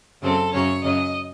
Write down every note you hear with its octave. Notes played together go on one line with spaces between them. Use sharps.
F#2 C#3 F#3 C4 A4
F#2 C#3 F#3 C#4 C#5
F#2 C#3 F#3 C#4 D#5